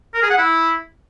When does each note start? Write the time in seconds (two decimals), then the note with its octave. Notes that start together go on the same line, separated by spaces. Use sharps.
0.14 A#4
0.22 G#4
0.30 F#5
0.38 E4